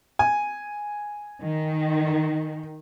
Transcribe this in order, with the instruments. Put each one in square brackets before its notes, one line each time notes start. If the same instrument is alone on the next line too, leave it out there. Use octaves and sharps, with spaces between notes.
[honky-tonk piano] G#5
[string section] D#3